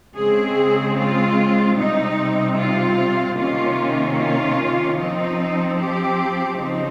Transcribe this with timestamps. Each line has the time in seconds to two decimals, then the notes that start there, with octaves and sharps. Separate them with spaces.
0.16 C#3 G#3 C4 G#4
0.97 F4
1.76 C3 G3 C4 D#4
2.58 F4
3.37 C3 D#3 A#3 C#4 F4
4.18 F4
4.98 F3 C4 D#4
5.78 G4
6.58 C#3 F3 C4 D#4